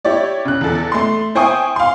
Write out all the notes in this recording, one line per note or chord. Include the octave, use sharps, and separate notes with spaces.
E4 G4 C#5 D5
C#3 F#6
E2 A4
A3 C6
E4 C5 G5 G#5 C#6 D#6
F5 C6